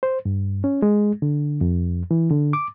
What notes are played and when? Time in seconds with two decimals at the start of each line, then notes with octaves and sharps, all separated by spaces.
0.03 C5
0.25 G2
0.64 C#4
0.82 G#3
1.22 D3
1.61 F2
2.11 E3
2.30 D3
2.53 D6